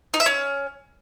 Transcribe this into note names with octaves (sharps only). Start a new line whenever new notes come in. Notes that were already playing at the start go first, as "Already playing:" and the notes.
D#4
E5
C#4